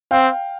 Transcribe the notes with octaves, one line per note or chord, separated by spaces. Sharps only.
C4 F5 G5